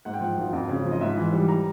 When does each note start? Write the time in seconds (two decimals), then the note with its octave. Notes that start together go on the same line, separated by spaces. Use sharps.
0.05 G#2 F#5
0.14 G5
0.21 F3 F#5
0.38 G#1
0.53 F2
0.69 C#3
0.86 F3
0.91 D#5
1.01 G#2 E5
1.17 E3
1.33 G3
1.48 A#5